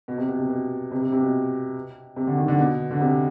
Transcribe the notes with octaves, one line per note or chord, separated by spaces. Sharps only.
B2
C3
B2
C3
B2
C3
C3
C3
B2
C3
D3
D#3
D3
B2
D3
C3